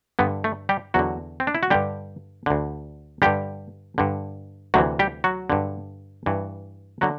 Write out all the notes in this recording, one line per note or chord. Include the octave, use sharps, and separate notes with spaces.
G2 D3 B3
A3
G3 G4
E2 D3 F#3 F#4
C4
D4
E4
F#4
G2 D3 G3 G4
D2 D3
G2 D3 G3 G4
G2 D3
D2 C3 E3 F#3 F#4
G3 G4
F#3 F#4
G2 D3
G2 E3
D3 F#3 F#4